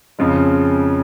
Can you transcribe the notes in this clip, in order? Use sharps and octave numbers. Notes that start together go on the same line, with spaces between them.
F2 C#3 F3 G#3